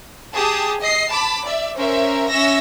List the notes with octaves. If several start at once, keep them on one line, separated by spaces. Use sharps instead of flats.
G4 G#4 A5 D#6
D#5 C7
A5 B5 D6
D5 E5
C#4 A#4 C5 E5
C#4 E5 E6 A#6